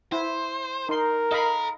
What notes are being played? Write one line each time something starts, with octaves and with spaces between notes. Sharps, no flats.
E4 C5
D#4 A#4 C6
A4 D#5 F5 A#5 B5